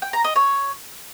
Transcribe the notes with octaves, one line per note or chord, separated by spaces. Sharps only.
G5
A#5
D#5
C#5